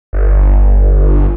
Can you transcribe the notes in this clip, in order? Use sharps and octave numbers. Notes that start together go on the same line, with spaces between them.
G1